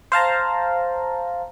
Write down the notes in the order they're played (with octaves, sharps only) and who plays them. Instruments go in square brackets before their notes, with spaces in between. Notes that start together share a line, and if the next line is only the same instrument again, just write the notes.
[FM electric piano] C5 F5 A5 A#5